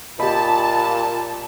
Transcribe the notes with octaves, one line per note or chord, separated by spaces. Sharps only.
A#2 G4 D#5 A5 B5